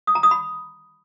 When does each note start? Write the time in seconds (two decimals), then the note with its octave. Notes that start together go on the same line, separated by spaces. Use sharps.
0.07 D#6
0.15 A#5
0.23 D#6
0.31 B5